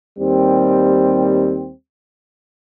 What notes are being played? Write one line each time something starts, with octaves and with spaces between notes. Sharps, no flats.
D#2 G3 C4